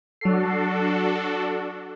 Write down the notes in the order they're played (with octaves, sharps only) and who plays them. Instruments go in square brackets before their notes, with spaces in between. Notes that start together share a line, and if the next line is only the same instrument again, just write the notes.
[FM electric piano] F#3 C7 [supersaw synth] D4 F#4 A4